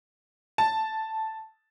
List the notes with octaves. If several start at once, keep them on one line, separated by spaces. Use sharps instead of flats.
A5